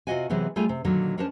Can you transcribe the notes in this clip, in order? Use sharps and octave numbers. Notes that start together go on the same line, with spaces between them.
C3 F4 F#4 D#5 F#5 G#5
C3 E3 F#3 G#3 B3
G3 A3 F4 G#4 G#5
C3
A#2 D3 D#3 F#3
G#3 C#4 D4 A#4 C5 A5